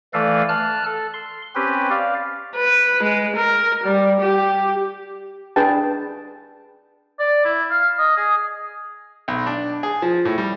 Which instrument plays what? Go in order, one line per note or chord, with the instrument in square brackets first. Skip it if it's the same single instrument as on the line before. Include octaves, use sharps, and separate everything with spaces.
[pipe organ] E3 A3 A4 B4 D5 F5
A5 F6 F#6
A4
C6
C4 C#4 G4 B4
D5 F5
[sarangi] B4
G#3
A#4
G3
G4
[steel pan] D4 G#4 B4 G5 A5
[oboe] D5
E4
F5
D#5
G#4
[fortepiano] B1
D4
G#4
F3
A2
G3